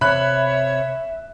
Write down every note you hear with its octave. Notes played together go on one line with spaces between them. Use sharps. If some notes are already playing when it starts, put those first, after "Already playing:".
C3 C#5 E5 B5 F#6